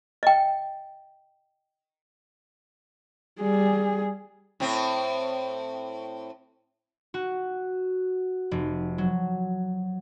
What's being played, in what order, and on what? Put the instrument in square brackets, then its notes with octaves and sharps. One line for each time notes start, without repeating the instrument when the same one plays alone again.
[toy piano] D#5 G5
[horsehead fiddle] G3 G#4
[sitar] A2 C4
[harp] F#4
F1
F#3